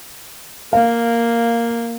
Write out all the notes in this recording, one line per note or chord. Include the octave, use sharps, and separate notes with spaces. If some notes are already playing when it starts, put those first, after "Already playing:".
A#3 F5